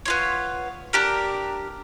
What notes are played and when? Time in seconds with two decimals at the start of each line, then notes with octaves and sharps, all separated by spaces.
0.05 B3 F4 C#5
0.93 D4 G4 A#4